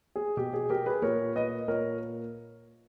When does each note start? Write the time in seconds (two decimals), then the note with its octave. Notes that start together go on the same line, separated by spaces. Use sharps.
0.16 G#4
0.37 B2 G4
0.54 G#4
0.70 G4 A#4
0.86 G#4 B4
1.02 A#2 A#4 C#5
1.35 B4 D#5
1.68 A#2 A#4 C#5